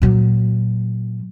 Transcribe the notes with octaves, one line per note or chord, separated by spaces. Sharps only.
A#2 F#3